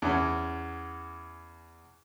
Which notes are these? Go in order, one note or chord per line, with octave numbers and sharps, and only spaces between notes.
E2 C#4